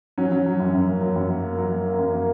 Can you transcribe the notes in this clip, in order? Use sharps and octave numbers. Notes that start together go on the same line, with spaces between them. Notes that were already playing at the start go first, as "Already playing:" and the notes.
F#3 C#4
F#3
F#3
F#2
F#2
A#3
F#3
F#2
A#3
A#3
F#3
A#3
A#3
F#2
A#3